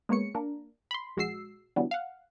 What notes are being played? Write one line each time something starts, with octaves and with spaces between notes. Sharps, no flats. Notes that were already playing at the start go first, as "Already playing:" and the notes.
G#3 A#3 B3 C#5 C#7
A#3 D4 A#4
B5 C6
A#1 G#3 F#4 E6 C7
D3 E3 F#3 G3 B3 D4
F5 F#5